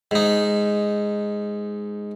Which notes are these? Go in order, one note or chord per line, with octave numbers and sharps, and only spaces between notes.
G#2 D#4